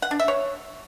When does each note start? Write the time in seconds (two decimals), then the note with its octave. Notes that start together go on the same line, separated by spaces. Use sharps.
0.02 F#5
0.11 D4
0.20 E5
0.28 C#5